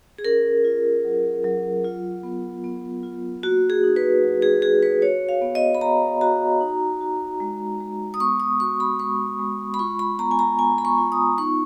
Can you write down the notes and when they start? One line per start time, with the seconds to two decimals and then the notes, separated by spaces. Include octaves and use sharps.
0.18 G#4
0.25 C#4 A#4
0.65 F4
1.05 F#3
1.44 F#3
1.84 F4
2.23 B3
2.64 B3
3.03 F4
3.43 A#3 F#4
3.70 G#4
3.83 D#4
3.96 B4
4.22 F#3
4.42 G#4
4.62 F#4 G#4
4.82 B4
5.02 F#4 C#5
5.29 F5
5.42 B3
5.55 D#5
5.75 B5
5.81 B3 A#5
6.21 F#4 A#5
6.61 D#4
7.01 F#4
7.40 G#3
7.80 G#3
8.14 D#6
8.20 B3 C#6
8.40 D#6
8.60 F#4 C#6
8.80 B5
8.99 G#3 C#6
9.39 G#3
9.74 B5
9.79 F4 C#6
9.99 B5
10.19 B3 A#5
10.31 G#5
10.39 A#5
10.58 B3 G#5
10.78 B5
10.85 C#6
10.98 F4
11.12 D#6
11.38 D#4 C#6